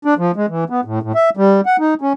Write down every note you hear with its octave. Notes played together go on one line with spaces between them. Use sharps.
D4
F3
G#3
E3
B3
A2
A2
E5
G3
F#5
D#4
C#4